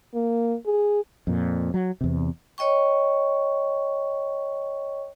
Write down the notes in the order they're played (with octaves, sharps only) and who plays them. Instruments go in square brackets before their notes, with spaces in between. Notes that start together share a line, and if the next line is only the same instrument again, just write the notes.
[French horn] A#3
G#4
[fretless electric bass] F2 A#2
F#3
E2 C3
[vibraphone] C#5 D#5 G5 C#6